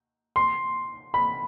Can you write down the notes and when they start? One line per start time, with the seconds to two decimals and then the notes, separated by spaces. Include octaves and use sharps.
0.36 C6
1.14 B5